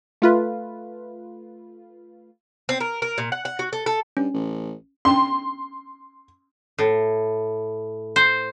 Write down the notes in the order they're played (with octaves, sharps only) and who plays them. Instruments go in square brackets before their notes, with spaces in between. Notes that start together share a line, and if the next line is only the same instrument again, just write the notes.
[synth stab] A3 F4 B4
[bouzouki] C4
A#4
A#4
A#2
F#5
F#5
F#4
A4
A4
[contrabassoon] G2 [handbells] C#4
[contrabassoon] A1
[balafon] C#4 G5 [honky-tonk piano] C6
[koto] A2
C5